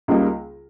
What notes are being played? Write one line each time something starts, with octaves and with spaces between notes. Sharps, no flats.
C#2 C#3 G3 A#3 D#4